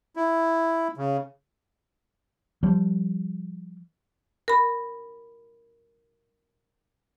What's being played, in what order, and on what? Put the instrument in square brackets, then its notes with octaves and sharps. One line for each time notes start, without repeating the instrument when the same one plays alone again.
[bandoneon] E4
C#3
[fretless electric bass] F3 G3
[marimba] A#4 B5